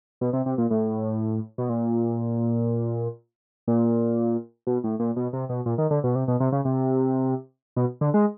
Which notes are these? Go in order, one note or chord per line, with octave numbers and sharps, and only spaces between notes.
B2
C3
C3
A#2
A2
B2
A#2
A#2
B2
A2
A#2
B2
C3
B2
A#2
D#3
D3
B2
C3
B2
C3
C#3
C3
B2
D3
G#3